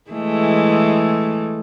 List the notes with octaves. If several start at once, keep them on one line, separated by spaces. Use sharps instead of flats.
E3 G#3 A3